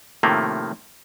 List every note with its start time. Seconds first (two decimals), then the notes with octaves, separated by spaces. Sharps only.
0.23 A2 C3 D#3 F3 A3 A#3